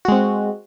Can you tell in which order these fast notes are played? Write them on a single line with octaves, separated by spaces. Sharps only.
F#4 G#3 C4